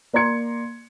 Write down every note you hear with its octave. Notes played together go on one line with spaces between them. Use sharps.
A#3 D5 A#5 C6 G#6 C#7